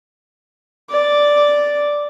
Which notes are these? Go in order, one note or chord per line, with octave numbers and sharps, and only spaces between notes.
D5